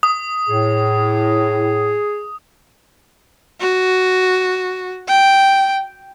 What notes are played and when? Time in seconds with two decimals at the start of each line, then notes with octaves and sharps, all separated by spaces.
0.03 D#6
0.48 A2 G#4
3.61 F#4
5.08 G5